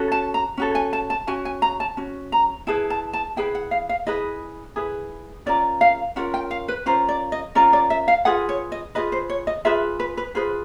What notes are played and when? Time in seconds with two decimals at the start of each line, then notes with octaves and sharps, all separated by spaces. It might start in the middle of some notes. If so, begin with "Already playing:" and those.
Already playing: C#4 F#4 A4
0.12 A5
0.34 A#5
0.57 C#4 F#4 A4
0.75 G#5
0.93 A5
1.10 A5
1.27 C#4 F#4 G#5
1.45 G#5
1.62 A#5
1.80 A5
1.97 C#4 F#4
2.32 A#5
2.67 E4 G#4 B4 A5
2.90 A5
3.13 A5
3.36 E4 G#4 B4 G5
3.55 F#5
3.71 F5
3.89 F5
4.07 E4 G#4 B4 D#5
4.76 E4 G#4 B4
5.46 C#4 F4 A#4 D5
5.81 F5
6.16 C#4 F4 A#4 F#5
6.34 G5
6.51 F5
6.68 B4
6.86 C#4 F4 A#4 C5
7.09 D5
7.32 D#5
7.55 C#4 F4 A#4 D5
7.73 D5
7.90 E5
8.08 F5
8.25 F4 G#4 B4 F#5
8.49 C#5
8.72 D#5
8.95 F4 G#4 B4 D#5
9.12 C5
9.30 C#5
9.47 D#5
9.65 F4 G#4 B4 E5
10.00 B4
10.17 B4
10.35 F4 G#4 B4 C5